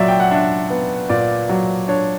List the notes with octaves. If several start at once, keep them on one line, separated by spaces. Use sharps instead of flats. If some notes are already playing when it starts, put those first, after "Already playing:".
Already playing: A#2 F#3 D5 E5
G5
F#5
D4 E5
B3
A#2 D5
F#3
D4 C#5